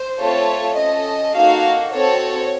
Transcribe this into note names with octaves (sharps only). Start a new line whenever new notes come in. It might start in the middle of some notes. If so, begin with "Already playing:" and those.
Already playing: C5
A3 C4 F4 A4 C#5
C#4 A4 D#5
A#3 D#4 F#4 A4 F5
C4 F#4 A4 C#5